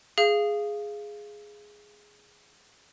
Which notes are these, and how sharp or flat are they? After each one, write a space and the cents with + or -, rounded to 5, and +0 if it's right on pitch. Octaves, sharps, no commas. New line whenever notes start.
G#4 +0 F5 -15